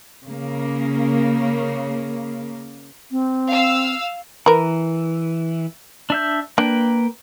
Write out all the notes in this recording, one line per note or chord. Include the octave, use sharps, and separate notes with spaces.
C#3 A#3
C4
F5 E6
E3 A#4 B4
D4 E5 G6
A#3 D4 B4 G5